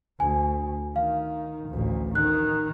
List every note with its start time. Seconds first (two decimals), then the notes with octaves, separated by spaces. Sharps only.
0.20 D2 G#5
0.96 D#3 F5
1.70 A1 D2
2.15 D#3 F#6